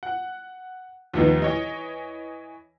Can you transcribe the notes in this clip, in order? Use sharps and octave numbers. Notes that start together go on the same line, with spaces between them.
F#5
D#2 F3 A3 B3 D#4
E3 C#5 D#5